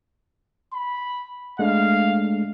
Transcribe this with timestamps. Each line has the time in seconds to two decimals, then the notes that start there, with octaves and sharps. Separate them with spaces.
0.74 B5
1.59 G#3 A3 D4 F5